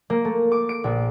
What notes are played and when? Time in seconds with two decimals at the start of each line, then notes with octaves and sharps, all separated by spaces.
0.10 A#3
0.25 A3
0.52 D6
0.69 D7
0.84 A#1